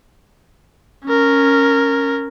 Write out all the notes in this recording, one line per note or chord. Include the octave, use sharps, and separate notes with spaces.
C#4 A#4